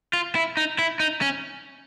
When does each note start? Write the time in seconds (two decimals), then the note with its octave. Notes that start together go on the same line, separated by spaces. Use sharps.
0.13 F4
0.35 E4
0.57 D#4
0.79 E4
1.00 D#4
1.21 C#4